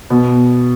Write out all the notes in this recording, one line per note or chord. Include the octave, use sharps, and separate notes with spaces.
B2